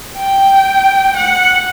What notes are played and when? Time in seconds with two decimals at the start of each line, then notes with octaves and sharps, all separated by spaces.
0.17 G5
1.17 F#5